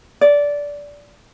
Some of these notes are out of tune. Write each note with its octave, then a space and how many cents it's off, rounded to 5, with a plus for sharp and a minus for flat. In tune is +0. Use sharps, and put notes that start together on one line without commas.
D5 -15